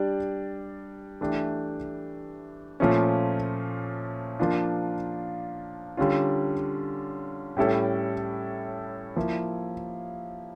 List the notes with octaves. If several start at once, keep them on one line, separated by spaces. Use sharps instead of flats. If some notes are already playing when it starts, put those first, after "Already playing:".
Already playing: G3 D4 G4 D5
E3 A3 D4 G4
A#2 F3 A3 C#4
F3 A#3 D4 F4
D3 G3 C#4 F4
A2 G3 C#4 E4 A4
F3 A#3 E4